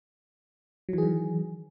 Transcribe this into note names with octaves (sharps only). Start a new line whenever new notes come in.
D#3 E3 F#3 G#4